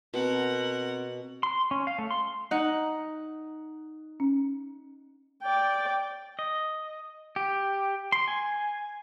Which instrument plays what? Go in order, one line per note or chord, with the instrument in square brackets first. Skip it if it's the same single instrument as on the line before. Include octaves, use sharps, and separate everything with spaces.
[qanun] B2 [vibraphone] C4 [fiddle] A#4 F#5
[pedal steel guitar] C6
C#4
F5
A3
C6
[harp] D#4 F#5
[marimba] C#4
[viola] D5 G5
[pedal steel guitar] D#5
G4
C6
G#5